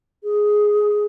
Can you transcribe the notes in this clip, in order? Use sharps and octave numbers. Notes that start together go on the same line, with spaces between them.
G#4